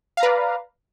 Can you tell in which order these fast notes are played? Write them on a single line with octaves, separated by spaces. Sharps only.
F5 A#5 B4 D5